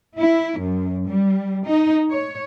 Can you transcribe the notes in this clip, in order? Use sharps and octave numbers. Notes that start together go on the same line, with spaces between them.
E4
F#2
G3
D#4
C#5